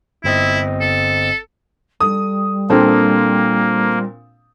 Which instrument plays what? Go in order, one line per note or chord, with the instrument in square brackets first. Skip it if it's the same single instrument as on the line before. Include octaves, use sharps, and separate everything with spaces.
[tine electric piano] G1 C4 D#5 [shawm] E4
[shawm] A4
[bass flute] G3 [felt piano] A4 [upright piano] D#6
[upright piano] A#2 C4 [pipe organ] A#3 [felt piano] D4 A4 C5